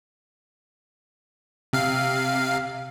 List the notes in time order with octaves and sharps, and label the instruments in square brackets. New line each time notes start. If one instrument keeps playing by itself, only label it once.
[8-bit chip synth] C3 F5